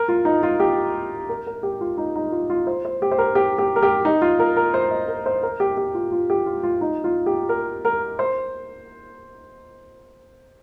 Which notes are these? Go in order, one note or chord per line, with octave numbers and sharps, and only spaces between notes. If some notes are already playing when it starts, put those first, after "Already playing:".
Already playing: A#4
F4
D#4
F4
G4
A#4
A#4
G4
F4
D#4
D#4
F4
F4
C5
C5
G4
C5
A#4
G4
G4
A#4
G4
D#4
F4
A#4
A#4
C5
D#5
A#4
C5
A#4
G4
G4
F4
F4
G4
F4
F4
D#4
F4
G4
A#4
A#4
C5